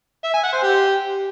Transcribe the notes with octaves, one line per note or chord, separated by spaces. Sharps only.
E5
G#5
F#5
C5
G4